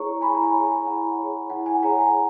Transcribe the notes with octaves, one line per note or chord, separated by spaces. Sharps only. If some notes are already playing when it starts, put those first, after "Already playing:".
Already playing: E4 G#4 C#5 A#5 C#6
E4 G#5 B5
A#5
G#5 B5
G#4 C#5
G#5 B5
E4 F#5 A#5
G#4 C#5
E4 F#5
G#5
G#4 C#5 F#5 A#5
G#5